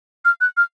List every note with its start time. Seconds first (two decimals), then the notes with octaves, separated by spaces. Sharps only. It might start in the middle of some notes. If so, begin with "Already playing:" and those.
0.25 F6
0.41 F#6
0.57 F6